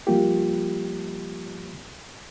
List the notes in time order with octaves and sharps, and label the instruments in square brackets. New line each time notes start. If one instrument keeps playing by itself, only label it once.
[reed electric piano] F3 G3 A#3 F4 G4